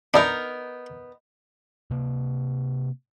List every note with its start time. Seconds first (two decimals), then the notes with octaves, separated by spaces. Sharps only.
0.14 B3 D4 D#4 A#4
1.91 C3 A#3